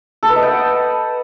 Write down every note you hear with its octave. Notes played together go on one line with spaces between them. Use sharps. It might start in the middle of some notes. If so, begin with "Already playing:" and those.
A4
B4
D#5
G5
F#5